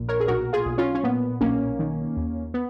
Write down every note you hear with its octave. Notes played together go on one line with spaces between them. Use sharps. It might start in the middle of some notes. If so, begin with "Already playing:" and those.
Already playing: A#1 A#2
A#4 C#5
G#4
B1 F#4 A#4
F4 G#4
B1
C#4 F4
C#4
A#2 B3
B1 A#3 C#4
D#3
D#2
B3